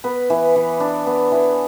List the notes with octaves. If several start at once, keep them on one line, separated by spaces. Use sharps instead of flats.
B3 B4
E3
E3
D4
B3
E3